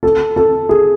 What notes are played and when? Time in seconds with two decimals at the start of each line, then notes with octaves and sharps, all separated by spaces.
0.03 A4
0.36 A4
0.69 G#4